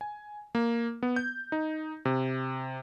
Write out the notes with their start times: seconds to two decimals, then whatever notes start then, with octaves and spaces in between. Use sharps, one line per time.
0.01 G#5
0.55 A#3
1.03 B3
1.16 G6
1.52 D#4
2.05 C3